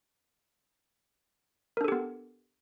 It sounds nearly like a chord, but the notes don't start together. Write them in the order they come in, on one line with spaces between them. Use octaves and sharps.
A#4 D4 A4 G4 B3